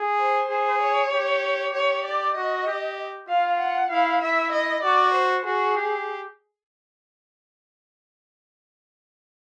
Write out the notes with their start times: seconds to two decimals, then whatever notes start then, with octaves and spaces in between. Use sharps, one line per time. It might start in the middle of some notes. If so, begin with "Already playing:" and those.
Already playing: G#4
0.20 C5
0.50 G#4
0.82 C#5
1.12 G4
1.74 G4 C#5
2.05 D5
2.36 F#4 D#5
2.67 G4
3.29 F4 F5
3.60 F#5
3.91 E4 F5
4.21 E4 E5
4.52 D#5
4.83 F#4 D5
5.14 C5
5.45 F#4 G#4
5.76 G4